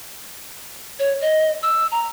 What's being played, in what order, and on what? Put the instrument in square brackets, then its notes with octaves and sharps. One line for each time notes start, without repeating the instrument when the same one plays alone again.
[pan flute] C#5
D#5
E6
A#5